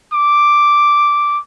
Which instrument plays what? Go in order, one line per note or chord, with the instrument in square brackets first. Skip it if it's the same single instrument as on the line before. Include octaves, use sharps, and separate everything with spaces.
[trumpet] D6